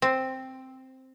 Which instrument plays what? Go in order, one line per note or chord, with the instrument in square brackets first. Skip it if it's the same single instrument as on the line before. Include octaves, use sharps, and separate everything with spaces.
[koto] C4